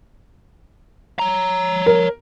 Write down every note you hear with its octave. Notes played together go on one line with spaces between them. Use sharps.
C#5 A#5
A#4